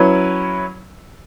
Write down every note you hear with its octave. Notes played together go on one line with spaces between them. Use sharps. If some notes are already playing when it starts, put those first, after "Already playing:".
Already playing: F#3 C#4 E4 B4